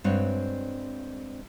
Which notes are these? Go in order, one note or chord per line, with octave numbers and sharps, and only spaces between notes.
G2 G#3 C4 F#4 C5 C#5